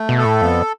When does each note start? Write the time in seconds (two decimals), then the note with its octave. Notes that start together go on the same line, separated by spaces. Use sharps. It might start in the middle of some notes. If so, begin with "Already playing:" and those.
Already playing: A3
0.09 B2
0.18 A4
0.25 A2
0.42 F2 B3